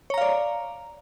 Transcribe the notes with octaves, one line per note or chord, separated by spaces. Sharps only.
C#5 D5 F5 A#5